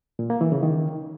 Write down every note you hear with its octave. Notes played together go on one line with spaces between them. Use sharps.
A#2
A#3
E3
C#3
D#3